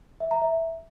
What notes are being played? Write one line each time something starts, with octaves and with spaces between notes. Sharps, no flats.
E5
A#5
E5